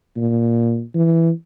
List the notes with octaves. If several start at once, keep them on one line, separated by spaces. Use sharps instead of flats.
A#2
E3